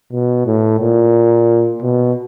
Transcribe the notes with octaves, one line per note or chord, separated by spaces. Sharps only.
B2
A2
A#2
B2